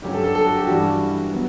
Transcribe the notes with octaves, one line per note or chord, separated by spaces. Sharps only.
G2 D3 F#3 C#4 G4
A4
A4
A4
F#4
G4
G2 E3 G3 F#4
F#4
F#3 B3